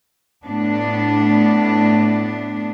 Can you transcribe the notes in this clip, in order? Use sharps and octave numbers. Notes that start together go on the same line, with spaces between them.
A2 B3 D4